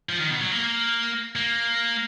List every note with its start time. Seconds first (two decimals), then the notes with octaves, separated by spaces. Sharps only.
0.09 F3
0.20 D#3
0.30 B2
0.41 F#3
0.52 A#3
1.36 A#3